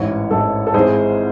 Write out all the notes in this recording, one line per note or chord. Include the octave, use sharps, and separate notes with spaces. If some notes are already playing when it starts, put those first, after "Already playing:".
Already playing: A1 G#2 E3 C#5
A1 G#2 E3 A4
A4
G#1 G#2 E3 G#4 C5